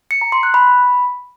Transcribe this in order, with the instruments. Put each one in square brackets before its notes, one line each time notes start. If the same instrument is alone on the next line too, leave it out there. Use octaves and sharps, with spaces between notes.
[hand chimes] C#7
A#5
C6
F#6
B5